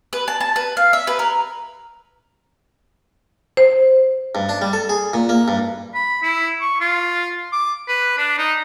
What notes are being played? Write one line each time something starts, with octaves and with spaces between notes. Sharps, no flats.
B4
A5
A5
B4
F5
E5
B4
A#4
C5
G2
D4
G3
A4
G#4
A#2
A#3
G2
B5
E4
C#6
F4
D6
B4
D4
D#4